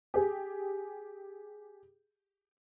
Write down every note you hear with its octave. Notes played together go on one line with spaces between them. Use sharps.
G4 G#4